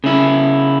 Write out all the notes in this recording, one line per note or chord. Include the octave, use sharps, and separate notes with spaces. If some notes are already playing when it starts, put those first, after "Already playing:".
C#3 E4